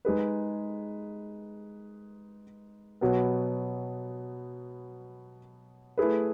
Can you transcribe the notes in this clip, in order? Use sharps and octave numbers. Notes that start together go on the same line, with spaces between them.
G#3 D#4 G#4 B4
B2 F#3 B3
A3 E4 G#4 B4